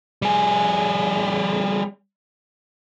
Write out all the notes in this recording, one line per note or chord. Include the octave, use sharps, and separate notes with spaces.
G3 G#4